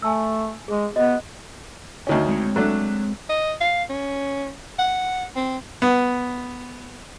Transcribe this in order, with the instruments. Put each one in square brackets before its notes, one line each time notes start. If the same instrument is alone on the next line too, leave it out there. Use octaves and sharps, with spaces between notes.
[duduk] A3 [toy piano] G#5 A5 E6
[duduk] G#3 [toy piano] G#4
[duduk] B3 [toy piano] F#4 D#5
[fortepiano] D2 D#3 C#4
[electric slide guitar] G#3 C4 C#5
[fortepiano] F#3 A3 D4
[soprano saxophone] D#5
F5
C#4
F#5
C4
[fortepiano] B3